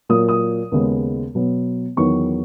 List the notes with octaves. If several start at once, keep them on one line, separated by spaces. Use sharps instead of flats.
A#2 F#3 A#3 D#6
D#6
D#2 C#3 G#3 B3
B2 F#3 B3
E2 D#3 F#3 B3 C#6